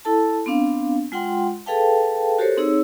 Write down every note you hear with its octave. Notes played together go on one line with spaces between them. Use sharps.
E4 A4 A5
B3 C4 D4 F5
G#3 F4 F#5 G5 C6
G#4 A4 B4 F5 G5 A5
F#4 G4 A4 A#4 C5 C#5
C4 D#4 G#4 C#5 E6